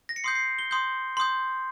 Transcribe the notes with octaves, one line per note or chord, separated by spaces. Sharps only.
A#6
C#7
C6 D#6 G6 C7
C7
G7
C6 D#6 G6 G7
C6 D#6 G6